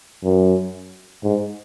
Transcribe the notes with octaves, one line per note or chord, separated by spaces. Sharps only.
F#2
G#2